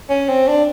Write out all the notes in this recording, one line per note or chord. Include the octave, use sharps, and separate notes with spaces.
C#4
C4
D4